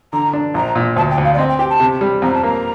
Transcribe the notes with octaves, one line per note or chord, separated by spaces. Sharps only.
D3 A#5
D4
A#1 A#5
A#2
D2 A5
G5
D2
F5
D5
C4 D#5
G5
G4 G5
A5
C3
G3
F2 A#5
A5
A#3 A#5